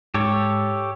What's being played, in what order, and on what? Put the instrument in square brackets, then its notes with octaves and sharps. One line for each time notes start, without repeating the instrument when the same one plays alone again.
[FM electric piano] G#2 [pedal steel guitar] G4 A4 C#5